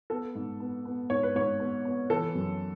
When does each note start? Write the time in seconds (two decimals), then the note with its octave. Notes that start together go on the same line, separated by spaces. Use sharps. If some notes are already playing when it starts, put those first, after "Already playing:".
0.10 B3 A4
0.35 G#2
0.60 B3
0.85 B3
1.10 G#2 C#5
1.23 B4
1.35 G#2 C#5
1.60 B3
1.85 B3
2.10 E3 A4
2.35 F#2